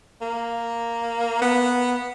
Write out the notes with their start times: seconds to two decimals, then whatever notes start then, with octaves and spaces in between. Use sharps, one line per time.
0.21 A#3
1.42 B3